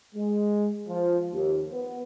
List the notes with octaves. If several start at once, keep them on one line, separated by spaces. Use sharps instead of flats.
G#3
F3
D#2
B3